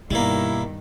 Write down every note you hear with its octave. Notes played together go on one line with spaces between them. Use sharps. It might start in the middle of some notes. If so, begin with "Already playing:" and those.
G2 B2 D#3 G3 A#3 E4